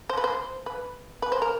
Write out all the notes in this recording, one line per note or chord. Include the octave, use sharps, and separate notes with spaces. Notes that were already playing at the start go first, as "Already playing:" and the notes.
C5
B4
C5
B4
B4
C5
A#4